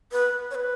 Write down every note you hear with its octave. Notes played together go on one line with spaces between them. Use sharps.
B4
C#5
B4